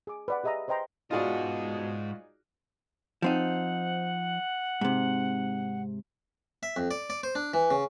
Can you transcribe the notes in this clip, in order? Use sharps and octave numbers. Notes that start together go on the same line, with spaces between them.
G#4 D6
B4 D5 F#5
G4 G#4 D#5 E5 A#5 D#6
B4 C5 D#5 G5 A#5 C6
G#2 B2 D#4 F4 F#4 G#4 D5 D#5
F3 C4 D#4 F#5
G#2 C3
E5
F2
D5
D5
C5
D4
E3
C#3